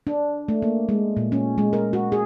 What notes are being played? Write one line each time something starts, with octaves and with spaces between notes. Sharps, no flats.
D4
A3
A#3
G#3
A#2
C#4
G#3
A#4
F#4
G#4